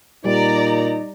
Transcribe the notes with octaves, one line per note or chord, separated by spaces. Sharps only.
A#2 G3 D#4 D5 A#5